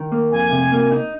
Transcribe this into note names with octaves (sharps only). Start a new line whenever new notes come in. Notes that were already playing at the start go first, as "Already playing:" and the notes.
Already playing: D#3
A#3
F2 G#5
C3
A#3
D#4